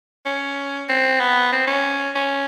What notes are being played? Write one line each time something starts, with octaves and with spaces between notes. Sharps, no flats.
C#4
C4
B3
C4
C#4
C#4